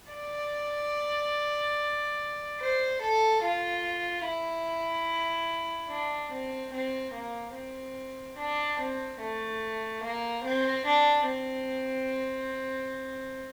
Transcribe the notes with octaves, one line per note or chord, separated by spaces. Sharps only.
D5
C5
A4
F4
E4
D4
C4
C4
A#3
C4
D4
C4
A3
A#3
C4
D4
C4